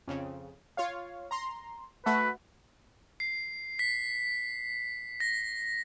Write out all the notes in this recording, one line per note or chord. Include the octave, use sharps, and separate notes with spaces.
F2 C#3
F4 C#5 F5
A#5 C6
A3 F#4 A4 B4
C7
B6
A#6